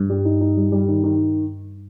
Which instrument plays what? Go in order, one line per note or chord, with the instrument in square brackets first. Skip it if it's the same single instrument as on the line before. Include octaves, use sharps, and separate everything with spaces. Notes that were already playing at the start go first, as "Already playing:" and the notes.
Already playing: [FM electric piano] G2
[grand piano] G3
D#4
D#4
G3
G3
D#3
D#3